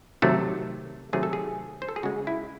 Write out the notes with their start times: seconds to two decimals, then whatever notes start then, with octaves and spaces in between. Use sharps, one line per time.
0.22 C3 D#3 F#3 A3 A4
1.13 C3 D#3 F#3 A3 G#4
1.23 A4
1.33 G#4
1.82 C5
1.88 A4
1.96 G#4
2.03 C#3 G#3 F#4
2.27 E4